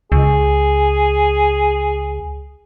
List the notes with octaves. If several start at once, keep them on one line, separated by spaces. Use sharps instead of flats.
C#2 G#4